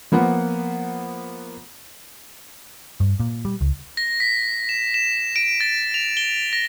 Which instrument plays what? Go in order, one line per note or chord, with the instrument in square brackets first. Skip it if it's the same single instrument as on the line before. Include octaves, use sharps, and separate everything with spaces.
[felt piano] F3 A#3 B3 F#5
[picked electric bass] G2
A#2
G3
C#2
[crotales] A#6
B6
E7
E7
D7
A6
F7
G7
A#6